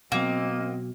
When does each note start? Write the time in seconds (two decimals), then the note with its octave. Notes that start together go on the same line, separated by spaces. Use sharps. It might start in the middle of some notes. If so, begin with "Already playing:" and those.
0.12 B2 F#3 A#3 C4 D#5